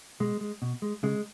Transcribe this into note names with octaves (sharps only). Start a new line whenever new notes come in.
B2 G#3
G#3
B2
G#3
C#3 G#3